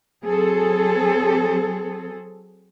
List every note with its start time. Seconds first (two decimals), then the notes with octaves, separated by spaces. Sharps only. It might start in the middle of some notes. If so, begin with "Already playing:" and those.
0.25 F#3 C4 G#4 A4